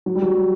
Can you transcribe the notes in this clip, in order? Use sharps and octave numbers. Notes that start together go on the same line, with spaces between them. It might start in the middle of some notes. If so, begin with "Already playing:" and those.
F#3
G3
F#3
G3